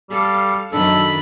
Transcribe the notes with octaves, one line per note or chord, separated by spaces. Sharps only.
G3 A4 F5
F#2 D#3 D4 A4 B5